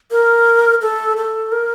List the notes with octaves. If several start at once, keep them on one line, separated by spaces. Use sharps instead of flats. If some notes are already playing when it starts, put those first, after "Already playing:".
A#4
A4
A4
A#4